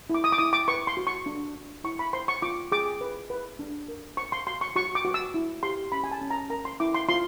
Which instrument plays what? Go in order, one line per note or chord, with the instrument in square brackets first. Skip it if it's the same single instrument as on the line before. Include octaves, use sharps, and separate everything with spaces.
[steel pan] E4 D6
D#6
D6
E4 D#6
D6
B4 C#6
C6
F#4
C#6
D4
D4
E4 C#6
B5
C5 C6
C#6
F4 D6
G#4 D6
B4
B4
D4
A#4
C5 C#6
C6
F#4 C6
C#6
F#4 C#6
D6
F#4
E6
E4
G4 C6
C#4 B5
G#5
A5
C#4
A#5
A#4 A#5
C6
E4 D6
C6
F4 C6